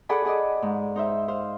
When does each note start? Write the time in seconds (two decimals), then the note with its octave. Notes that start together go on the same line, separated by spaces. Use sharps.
0.09 G#4 A4 D5 F#5 G#5 B5
0.25 G#4 D5 D#5
0.62 G#2
0.96 D#4 C5 E5
1.28 C5 F5